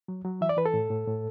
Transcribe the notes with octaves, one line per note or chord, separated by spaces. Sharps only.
F#3
F#3
E3 E5
D5
E3 B4
A4
A2
A2
A2